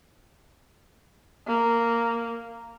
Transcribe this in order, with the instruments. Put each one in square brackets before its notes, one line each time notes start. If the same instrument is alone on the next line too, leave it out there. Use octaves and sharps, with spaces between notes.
[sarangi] A#3